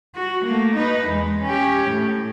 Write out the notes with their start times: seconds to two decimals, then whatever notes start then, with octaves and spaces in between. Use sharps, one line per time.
0.15 F#4
0.45 A3 A#3
0.76 D#4 B4
1.08 E2 G#3
1.42 C#4 G4
1.90 A2